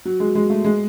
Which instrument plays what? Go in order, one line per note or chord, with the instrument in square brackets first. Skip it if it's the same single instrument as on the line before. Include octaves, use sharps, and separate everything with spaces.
[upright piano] F#3
G#3
G#3
A3
G#3